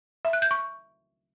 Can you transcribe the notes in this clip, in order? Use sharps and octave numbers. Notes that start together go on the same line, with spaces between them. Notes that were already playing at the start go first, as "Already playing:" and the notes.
E5
F#6
G6
C#6